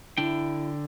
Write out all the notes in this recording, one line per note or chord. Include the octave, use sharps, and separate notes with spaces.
D3 D4 E4 G5